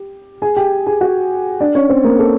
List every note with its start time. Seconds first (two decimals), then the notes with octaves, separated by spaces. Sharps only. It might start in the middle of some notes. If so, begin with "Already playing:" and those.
Already playing: G4
0.42 G#4 G#5
0.57 G4 G5
0.86 G#4 G#5
1.01 F#4 F#5
1.60 D4 D5
1.75 C#4 C#5
1.89 C4 C5
2.04 A#3 A#4
2.19 A4